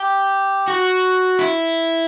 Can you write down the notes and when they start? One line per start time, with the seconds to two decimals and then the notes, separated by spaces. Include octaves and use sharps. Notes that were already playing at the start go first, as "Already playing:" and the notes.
Already playing: G4
0.68 F#4
1.39 E4